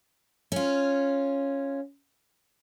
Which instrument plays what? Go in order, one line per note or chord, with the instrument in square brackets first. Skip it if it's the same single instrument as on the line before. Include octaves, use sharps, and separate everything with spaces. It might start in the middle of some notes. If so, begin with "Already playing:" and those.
[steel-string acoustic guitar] C#4 F4